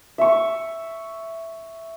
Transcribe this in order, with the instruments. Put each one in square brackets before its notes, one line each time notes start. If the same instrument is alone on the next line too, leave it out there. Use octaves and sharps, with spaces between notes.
[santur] E5 C#6